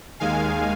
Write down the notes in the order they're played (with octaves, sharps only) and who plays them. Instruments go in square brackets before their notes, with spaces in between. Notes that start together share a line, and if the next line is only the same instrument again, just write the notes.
[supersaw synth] D#2 D#3 G#3 F5 G#5